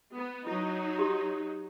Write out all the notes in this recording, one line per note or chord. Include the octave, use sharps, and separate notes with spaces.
B3
F#3 D#4 E4
F#4 G4